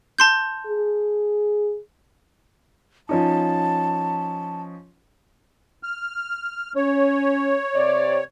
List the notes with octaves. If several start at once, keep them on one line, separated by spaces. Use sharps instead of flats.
A5 C6 G6
G#4
F3 C#4 D#4 A5
F6
C#4 C#5
C3 D5